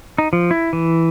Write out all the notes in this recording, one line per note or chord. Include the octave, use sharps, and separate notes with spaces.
D#4
F3
E4
E3